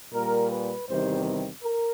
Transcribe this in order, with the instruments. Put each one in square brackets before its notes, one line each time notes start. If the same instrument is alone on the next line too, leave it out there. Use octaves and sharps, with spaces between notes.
[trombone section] A#2 G3 A#4
B4
E2 C3 D#3 G3 C5
A#4